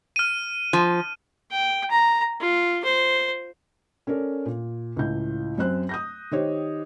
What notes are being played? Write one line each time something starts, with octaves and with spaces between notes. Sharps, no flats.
F6 D#7
F3
G5
A#5
F4
C5
C#4 A4 A#4 D5
A#2
C#2 A2 G6
F#2 C4 C5 F#6
D#6 G6 A#6
D#3 G4 C5 C#5 D#5